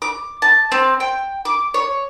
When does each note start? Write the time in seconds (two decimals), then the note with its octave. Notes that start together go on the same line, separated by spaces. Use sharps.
0.02 D6
0.42 A5
0.72 C4
1.00 G5
1.45 D6
1.74 C#5